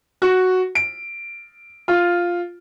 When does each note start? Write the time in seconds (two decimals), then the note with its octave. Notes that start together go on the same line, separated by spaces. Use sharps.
0.22 F#4
0.75 D7
1.88 F4